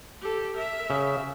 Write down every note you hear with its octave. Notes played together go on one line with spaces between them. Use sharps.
G4 A4
A#4 E5
C#3